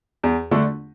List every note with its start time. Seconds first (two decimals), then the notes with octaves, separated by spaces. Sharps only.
0.24 E2
0.51 D3 A3 D4